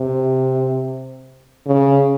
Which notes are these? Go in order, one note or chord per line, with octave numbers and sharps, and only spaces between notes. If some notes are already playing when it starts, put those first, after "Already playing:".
Already playing: C3
C#3